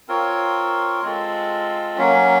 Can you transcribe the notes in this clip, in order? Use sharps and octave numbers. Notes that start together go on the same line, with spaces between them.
C4 F4 A#4 C#5
G#3 C4 F4 A4
F#3 A#3 C#4